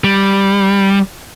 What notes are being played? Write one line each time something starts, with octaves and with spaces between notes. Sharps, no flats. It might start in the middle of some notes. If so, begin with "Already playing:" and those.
G3